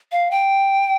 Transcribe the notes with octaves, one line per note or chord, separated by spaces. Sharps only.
F5
G5